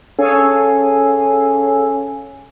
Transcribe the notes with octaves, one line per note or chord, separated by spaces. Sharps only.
C#4 G#4 A4 C#5 F5 G#5